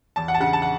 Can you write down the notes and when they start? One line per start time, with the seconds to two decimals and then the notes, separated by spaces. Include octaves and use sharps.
0.16 E2 A5
0.28 F#5
0.34 A5
0.40 C#3 F#5
0.53 A5
0.62 F#5